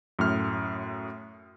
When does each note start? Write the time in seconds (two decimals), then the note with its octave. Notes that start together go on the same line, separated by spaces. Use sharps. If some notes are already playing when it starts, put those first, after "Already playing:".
0.19 F#2 A2 F6